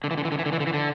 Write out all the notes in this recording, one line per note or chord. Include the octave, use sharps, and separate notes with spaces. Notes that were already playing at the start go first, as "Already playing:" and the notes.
D3
E3
D3
E3
D3
E3
D3
E3
D3
E3
D3